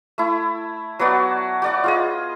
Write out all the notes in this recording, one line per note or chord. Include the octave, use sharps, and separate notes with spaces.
A3 E4
F#3 B3 F#4 D5
F#4 D5 F#5
F4 G#4 D#5